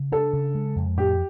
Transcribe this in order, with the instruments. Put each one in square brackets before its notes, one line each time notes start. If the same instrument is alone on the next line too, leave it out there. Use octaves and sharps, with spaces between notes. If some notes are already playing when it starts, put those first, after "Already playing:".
Already playing: [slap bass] C#3
[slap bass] D4 [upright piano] A4
[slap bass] C#3
G#3
F2
[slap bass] A2 [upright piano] G4